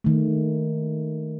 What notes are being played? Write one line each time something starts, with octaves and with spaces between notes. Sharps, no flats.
D#3 A3